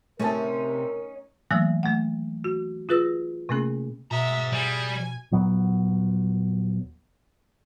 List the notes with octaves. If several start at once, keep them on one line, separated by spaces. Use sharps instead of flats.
C3 A3 C#4 D#4 A#4 A5
D#3 E3 F#3 A3 A#3
A3 F#5
F#4
F4 G#4 B4 E6 A#6
C3 A3 A#3 C#4 G#4
B2 G#4 E5 A#5
G3 G#5
D#1 F#3 B3